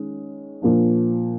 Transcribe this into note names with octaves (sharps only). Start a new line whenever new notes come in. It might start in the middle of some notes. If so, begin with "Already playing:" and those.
Already playing: D#3 G#3 C#4
A#2 F3 A#3 D4